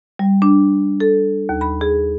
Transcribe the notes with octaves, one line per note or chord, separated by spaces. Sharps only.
G3
D4
A4
D#2
B5
G#4